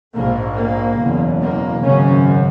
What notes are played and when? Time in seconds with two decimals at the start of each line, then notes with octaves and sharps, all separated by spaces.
0.14 A#1 G#2 A#3
0.57 A#3
0.99 F#1 E2 B2
1.41 A#3
1.83 G#1 F#2 C#3 C#4